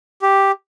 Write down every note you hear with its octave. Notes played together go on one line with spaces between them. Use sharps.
G4